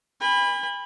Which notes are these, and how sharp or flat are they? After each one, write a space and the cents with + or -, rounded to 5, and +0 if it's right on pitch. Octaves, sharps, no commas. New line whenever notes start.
G#5 -45 B5 +0